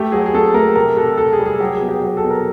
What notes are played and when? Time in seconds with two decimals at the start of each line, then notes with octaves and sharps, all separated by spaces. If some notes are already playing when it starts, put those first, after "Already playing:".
Already playing: A3 G4
0.12 F#3 G#4
0.26 G#4
0.34 A3 A4
0.54 A3 A#4
0.75 C3 A#4
0.97 C3 A4
1.17 C3 A4
1.33 G#4
1.39 G3
1.46 G#4
1.60 F#3 G4
1.75 G#4
1.81 B2
1.89 G4
2.02 F#3
2.17 A4
2.23 B2
2.30 A#4